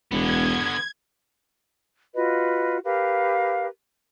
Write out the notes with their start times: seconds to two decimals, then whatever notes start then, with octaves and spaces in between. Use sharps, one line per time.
0.12 E1 D3 B3 G#6
2.15 F4 F#4 B4 D#5
2.84 G4 A#4 B4 F5